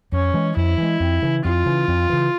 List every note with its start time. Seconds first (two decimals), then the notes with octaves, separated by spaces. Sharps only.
0.12 F2 C#4
0.34 E3 G#3
0.56 F2 E4
0.78 E3 G#3
1.00 F2
1.22 C#3 E3
1.45 F2 F4
1.66 C#3 E3
1.88 F2
2.10 C#3 E3